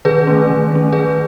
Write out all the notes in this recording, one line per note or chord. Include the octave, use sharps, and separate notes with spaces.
D#3 G#4 B4
A3 C#4
D#3
A3 C#4
D#3 G#4 B4